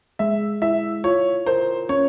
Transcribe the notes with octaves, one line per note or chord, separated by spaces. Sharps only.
G#3 E5
E4 E5
F4 C#5
A#4 C5
C#4 C#5